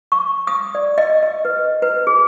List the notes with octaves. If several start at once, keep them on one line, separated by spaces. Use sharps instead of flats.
C#6
D#6
D5
D#5
D#5
B4
B4
G#4